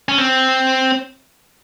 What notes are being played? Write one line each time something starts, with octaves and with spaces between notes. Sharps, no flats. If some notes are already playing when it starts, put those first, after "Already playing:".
C#4
C4